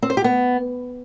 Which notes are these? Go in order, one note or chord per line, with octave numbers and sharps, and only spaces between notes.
C4
C5
G4
B3